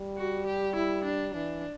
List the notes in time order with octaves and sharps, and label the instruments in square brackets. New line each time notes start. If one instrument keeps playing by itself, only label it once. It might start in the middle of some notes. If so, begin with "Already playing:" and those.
Already playing: [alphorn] G3
[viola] F#4
G4
E4
D4
[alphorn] E3 [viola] D4